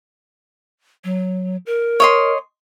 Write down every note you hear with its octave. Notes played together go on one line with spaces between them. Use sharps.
F#3
A#4
C#5 D#5 C6